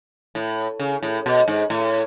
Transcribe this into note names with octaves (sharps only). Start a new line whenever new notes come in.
A2
C#3
A2
B2
G#2
A2